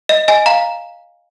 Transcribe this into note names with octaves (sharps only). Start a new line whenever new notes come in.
D#5
D#5 G#5
F5 A#5